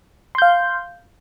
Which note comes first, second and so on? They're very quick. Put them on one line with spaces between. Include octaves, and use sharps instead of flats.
C6 G6 F5